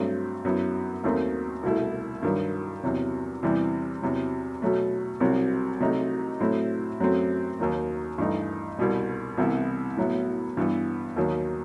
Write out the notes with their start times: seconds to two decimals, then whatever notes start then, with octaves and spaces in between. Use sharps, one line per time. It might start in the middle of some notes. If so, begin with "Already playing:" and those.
Already playing: G2 F#3 A3 C4
0.45 F#2 F#3 B3 E4
1.04 D#2 D#3 F#3 A3 C4
1.63 C2 B2 A3 E4
2.23 G2 D#3 F#3
2.83 E2 C3 F#3
3.43 E2 C3 E3 G3 C4
4.02 E2 C3 F#3
4.62 B2 F#3 A3
5.20 C2 C3 F#3 C4
5.80 C3 F#3 A3 D#4
6.40 A2 F#3 A3 C4 E4
7.00 F#2 F#3 A3 C4
7.60 D#2 D#3 F#3
8.18 G2 E3 A3 D#4
8.79 C2 B2 G3
9.38 C2 C3 E3 B3 E4
9.97 A2 F#3 B3 E4
10.57 G2 E3 B3
11.16 D#2 D#3 F#3